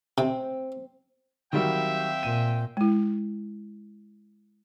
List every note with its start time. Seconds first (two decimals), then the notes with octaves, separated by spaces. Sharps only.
0.18 C3 C4
1.53 D#3 F#3 G3 C4 E5 F5 G5
2.23 A#2 D#7
2.77 G#3 E4